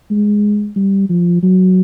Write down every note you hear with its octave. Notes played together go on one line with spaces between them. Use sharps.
G#3
G3
F3
F#3